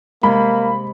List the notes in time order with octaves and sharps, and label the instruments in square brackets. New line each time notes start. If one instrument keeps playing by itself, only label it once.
[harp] C3 G#3 [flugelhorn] A#3 [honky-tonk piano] B5